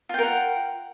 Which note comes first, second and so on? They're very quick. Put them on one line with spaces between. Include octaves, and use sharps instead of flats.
F4 G5 A#4 F#5